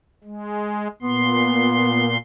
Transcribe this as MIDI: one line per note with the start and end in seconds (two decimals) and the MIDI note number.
0.24 0.88 56
1.03 2.17 46
1.03 2.15 59
1.03 2.17 84